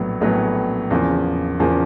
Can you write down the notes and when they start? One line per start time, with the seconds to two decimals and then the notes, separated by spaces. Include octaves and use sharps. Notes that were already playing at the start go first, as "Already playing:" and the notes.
Already playing: A#1 A2 F#3 B3
0.21 A#1 A2 F#3 B3
0.91 E2 C#3 F3 A#3
1.60 E2 C#3 F3 A#3